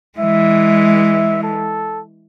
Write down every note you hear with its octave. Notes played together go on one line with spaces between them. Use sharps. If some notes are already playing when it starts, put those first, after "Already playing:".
E3 G#3 E5
A4